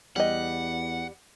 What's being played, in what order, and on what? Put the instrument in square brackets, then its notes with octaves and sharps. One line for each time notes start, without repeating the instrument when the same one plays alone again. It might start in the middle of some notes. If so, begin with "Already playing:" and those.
[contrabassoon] E2 [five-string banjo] G3 D#5 [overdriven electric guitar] F#5